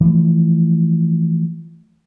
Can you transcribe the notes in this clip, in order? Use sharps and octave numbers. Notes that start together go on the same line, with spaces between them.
E3 F3 A3